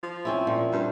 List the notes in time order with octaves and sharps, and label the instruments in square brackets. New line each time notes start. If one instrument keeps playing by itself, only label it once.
[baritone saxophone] F3
[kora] C4 C#4 E4
A#2
[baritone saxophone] G2